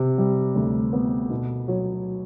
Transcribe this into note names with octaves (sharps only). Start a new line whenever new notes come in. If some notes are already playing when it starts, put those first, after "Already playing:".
Already playing: C3
G3
D2
B3
B2
F#3